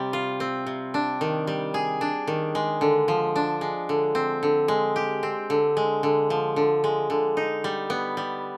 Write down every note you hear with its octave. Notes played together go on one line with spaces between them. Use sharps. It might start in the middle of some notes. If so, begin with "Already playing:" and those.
Already playing: C3 G3
F4
C4
C3
D4
D#3
G3
G#4
D4
D#3
G#3
D3
F3
D4
G#3
D3
C4
D3
G#3
G4
C4
D3
G#3
D3
F3
D3
G#3
D3
D#4
G3
B3
G3